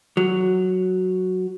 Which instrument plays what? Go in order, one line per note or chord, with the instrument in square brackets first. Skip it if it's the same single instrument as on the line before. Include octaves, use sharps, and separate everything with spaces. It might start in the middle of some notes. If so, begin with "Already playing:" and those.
[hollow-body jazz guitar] F#3